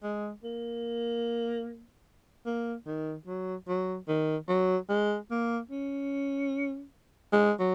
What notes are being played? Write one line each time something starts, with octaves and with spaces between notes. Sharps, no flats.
G#3
A#3
A#3
D#3
F#3
F#3
D#3
F#3
G#3
A#3
C#4
G#3
F#3